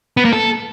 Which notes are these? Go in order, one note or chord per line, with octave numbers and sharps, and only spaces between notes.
B3
A#3
A4